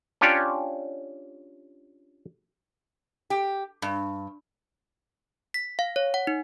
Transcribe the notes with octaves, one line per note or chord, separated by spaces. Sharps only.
C#4 D4 F4 G4 C#5 D5
G4
G2
B6
F5
C#5
F#5
D#4